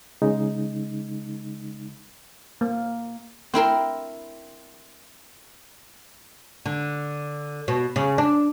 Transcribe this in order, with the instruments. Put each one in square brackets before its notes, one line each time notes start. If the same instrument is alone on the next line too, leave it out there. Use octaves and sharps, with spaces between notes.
[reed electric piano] C#3 G#3 D#4
[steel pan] A#3
[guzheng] C4 E4 A#4 C6
[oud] D3
B2
C#3
D4